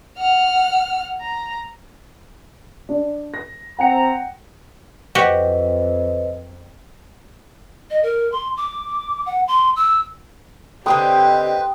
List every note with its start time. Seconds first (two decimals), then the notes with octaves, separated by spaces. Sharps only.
0.18 F#5 F6
1.21 A#5
2.89 D4
3.34 A#6
3.79 C4 F#5 G5 A#5 C#7
5.15 F2 F#4 G4 B4 C5 D#5
7.90 D#5
8.03 A#4
8.32 C6
8.57 D6
9.26 F#5
9.48 C6
9.76 E6
10.86 D3 C4 D#4 G4 B4 C5 G5 D#6